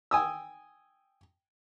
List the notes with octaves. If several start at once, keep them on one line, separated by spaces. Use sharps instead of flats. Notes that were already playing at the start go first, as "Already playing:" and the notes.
G5 G#5 D#6 E6